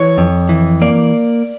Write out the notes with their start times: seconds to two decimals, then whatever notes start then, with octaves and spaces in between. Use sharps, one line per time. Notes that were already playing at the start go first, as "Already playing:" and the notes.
Already playing: E3 C#5
0.18 F2
0.49 E3
0.82 A#3 D5